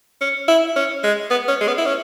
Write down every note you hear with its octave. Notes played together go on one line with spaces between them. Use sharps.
C#4
E4
C#4
G#3
B3
C#4
G#3
B3
E4
C#4